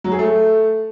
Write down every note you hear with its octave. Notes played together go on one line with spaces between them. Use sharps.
F#3
G#4
A3